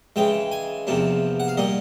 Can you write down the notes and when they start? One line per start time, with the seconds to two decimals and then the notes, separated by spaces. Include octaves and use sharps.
0.16 C#3 E3 G#3 G5
0.52 G#5
0.87 E2 C3 F3 A#3 D4
1.40 F#5
1.48 F5
1.57 A#2 G3 A#3 D#5